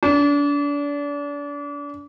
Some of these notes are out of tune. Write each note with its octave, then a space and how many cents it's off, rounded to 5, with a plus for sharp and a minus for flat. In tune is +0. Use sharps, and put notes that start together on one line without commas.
D4 -35